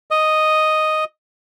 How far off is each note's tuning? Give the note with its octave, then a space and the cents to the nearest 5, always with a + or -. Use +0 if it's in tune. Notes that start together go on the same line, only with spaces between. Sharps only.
D#5 +0